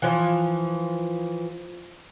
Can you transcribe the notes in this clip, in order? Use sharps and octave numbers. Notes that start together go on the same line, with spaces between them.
E3 F3